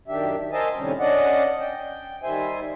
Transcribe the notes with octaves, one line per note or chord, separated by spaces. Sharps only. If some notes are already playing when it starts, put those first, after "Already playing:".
F#2 D#3 D4 G4 E5
A#4 C5 D#5 E5 G#5 A5
A2 C3 D#3 G3 C#4
C#4 D4 D5 D#5 F#5
G5
D#3 G3 C5 E5 G#5